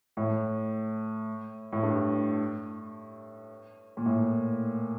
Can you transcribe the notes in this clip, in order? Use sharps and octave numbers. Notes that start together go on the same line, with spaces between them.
A2
A2
G2
A#2
A2